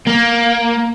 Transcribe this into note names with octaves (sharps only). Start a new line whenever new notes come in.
A#3